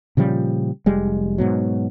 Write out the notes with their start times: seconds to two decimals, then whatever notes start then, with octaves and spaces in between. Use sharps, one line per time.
0.17 A#2 C#3 F3 G3
0.86 F1 G3 G#3
1.38 G#2 B2 F#3